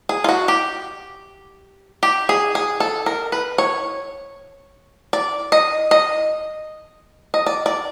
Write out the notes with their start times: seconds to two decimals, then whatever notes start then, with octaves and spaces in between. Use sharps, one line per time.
0.09 G#4
0.24 F4
0.29 F#4
0.48 G4
2.03 G4
2.29 G#4
2.55 G#4
2.80 A4
3.06 A#4
3.32 B4
3.58 C#5
5.13 D5
5.52 D#5
5.91 D#5
7.34 D#5
7.46 D5
7.66 D5